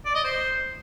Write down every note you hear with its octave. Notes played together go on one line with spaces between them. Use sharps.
D5
D#5
C5